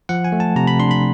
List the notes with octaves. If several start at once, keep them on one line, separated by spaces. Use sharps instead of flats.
F3 F#5
G#5
A3
A5
C3 A#5
B5
D4 C6
B5